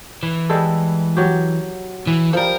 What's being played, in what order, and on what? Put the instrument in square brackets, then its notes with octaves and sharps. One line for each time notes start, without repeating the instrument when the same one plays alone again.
[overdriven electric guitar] E3
[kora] G3 G#3 A4
F#3 F#4 G4
[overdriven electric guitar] E3
[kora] F3 G3 [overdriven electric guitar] A4 A#4